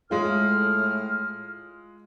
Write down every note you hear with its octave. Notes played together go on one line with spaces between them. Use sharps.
A2 G#3 F4 F6